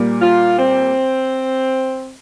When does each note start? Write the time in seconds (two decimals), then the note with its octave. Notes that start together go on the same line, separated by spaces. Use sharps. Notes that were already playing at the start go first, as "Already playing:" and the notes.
Already playing: A#2 G3 A#3
0.21 F4
0.58 C4